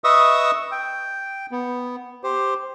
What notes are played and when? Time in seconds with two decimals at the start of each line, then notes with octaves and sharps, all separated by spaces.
0.04 B4 D#5 E5 C#6 D#6 E6
0.72 G5
1.51 B3
2.24 G4 C5